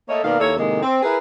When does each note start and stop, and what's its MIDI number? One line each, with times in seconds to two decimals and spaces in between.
0.09 0.22 57
0.09 0.22 58
0.09 0.22 69
0.09 0.22 73
0.09 0.22 75
0.24 0.36 47
0.24 0.36 51
0.24 0.36 58
0.24 0.36 59
0.24 0.36 74
0.24 0.36 77
0.39 0.53 39
0.39 0.53 58
0.39 0.53 64
0.39 0.53 69
0.39 0.53 73
0.57 0.81 45
0.57 0.81 48
0.57 0.81 51
0.57 0.81 56
0.57 0.81 58
0.82 1.01 60
1.03 1.16 64
1.03 1.16 68
1.03 1.16 70
1.03 1.16 71